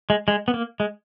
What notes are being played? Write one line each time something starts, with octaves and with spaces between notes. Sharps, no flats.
G#3
G#3
B3
A#3
G#3